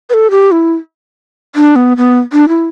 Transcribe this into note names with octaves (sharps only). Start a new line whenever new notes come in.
B4
A4
G4
E4
D4
B3
B3
D4
E4